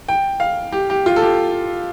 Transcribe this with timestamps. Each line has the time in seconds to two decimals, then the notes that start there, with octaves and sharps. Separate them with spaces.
0.09 G5
0.40 F5
0.72 G4
0.90 G4
1.06 F4
1.16 A4
1.22 G4